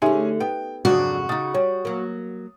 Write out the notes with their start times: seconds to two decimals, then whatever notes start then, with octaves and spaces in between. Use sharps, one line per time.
0.02 D3 A3 C#4 D#4 G4 G#4 E5 G#5
0.40 B3 G5
0.85 F2 G#2 C#3 F#3 D4 F#4
1.29 C#3 D#4 D#6 A6
1.55 G3 C#5
1.85 F#3 A#3